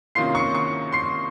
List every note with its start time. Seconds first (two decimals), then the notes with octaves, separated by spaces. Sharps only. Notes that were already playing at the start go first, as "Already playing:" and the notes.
0.15 C3 D#3 A#3 C#4 F4 C6 C7
0.35 C#6 C#7
0.54 C#6 C#7
0.92 C6 C7